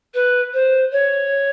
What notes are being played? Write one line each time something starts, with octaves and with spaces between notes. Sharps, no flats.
B4
C5
C#5